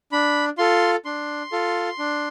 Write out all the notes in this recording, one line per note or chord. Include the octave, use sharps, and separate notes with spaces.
D4 B5
F4 A4 C6
D4 C6
F4 A4
D4